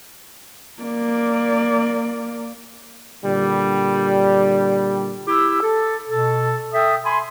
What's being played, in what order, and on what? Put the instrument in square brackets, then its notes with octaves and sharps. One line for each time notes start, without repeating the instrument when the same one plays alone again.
[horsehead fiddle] A#3 D5
[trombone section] A#2 D3 G3
[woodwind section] E4 G4 E6
A4
B2 A4
A4 E5 G5 D#6
G#5 B5 C6